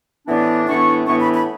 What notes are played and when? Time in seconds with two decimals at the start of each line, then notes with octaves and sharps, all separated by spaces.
0.26 A2 E3 B3 D4
0.66 A2 E3 B3 D4 C#6
1.05 A2 E3 B3 D4 C#6
1.19 B5
1.33 B5